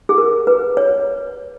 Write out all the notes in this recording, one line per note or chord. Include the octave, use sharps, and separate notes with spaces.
G#4
A#4
B4
C#5